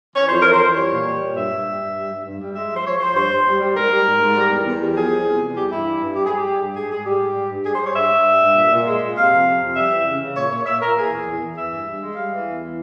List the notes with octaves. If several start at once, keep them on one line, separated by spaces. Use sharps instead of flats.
E3 C#5
F2 C5
E3 A#4
C5
E3
G3 C#5
A#2
G3
A#2
G2 E5
G2
G3
G2
G3
G2
G2
G3
G#3 E5
F3
C5
F3 C#5
F3 C5
G2 C5
G2
G3
G3
G#2 A#4
G3
G#2
G#2
G3
E2
E2
G3
F3 G#4
E2
C3
E2
G3 G4
G2 E4
G3
G2
G3 G4
G#4
G3 G4
G3
G2
G#2 G#4
G#2 G#4
G3 G4
G#2
G3
G2
G3 G#4
C5
G3
C#5
G2 E5
G2
G3
G2
A#2
A#2
G#3
A#2
C3 F5
F2
C3
F2
G3 E5
E3
C#3
C#3
A#2 C#5
A#2 C#5
A#2 E5
A#2 A#4
E3 G#4
E2
E2
E2
E3 E5
G2
G2
G#3
G3 F5
E3
E2
E3